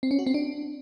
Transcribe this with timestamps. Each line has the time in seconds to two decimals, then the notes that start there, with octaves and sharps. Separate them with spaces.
0.03 C4
0.11 C#4
0.19 F#4
0.26 C4
0.34 D4